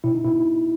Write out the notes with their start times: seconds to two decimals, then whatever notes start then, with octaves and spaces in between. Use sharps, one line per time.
0.04 B2 E4
0.15 D#4
0.25 B2 E4